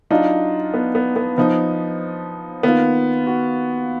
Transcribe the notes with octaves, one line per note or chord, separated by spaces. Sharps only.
F#3 D4 D#4 F4
B3
B3
B3
F3 B3 D#4
D#3 A#3 B3 F4
F#4